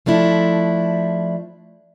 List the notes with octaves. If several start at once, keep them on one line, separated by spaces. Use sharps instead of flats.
F3 A3 D4 E4